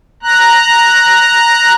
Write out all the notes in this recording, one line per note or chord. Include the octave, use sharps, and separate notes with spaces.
A#5 F#6